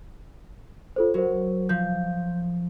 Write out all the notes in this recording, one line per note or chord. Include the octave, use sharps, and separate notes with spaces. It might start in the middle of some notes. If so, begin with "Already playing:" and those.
F4 A4 C5
F#3 F#4 A#4 C5
F3 G6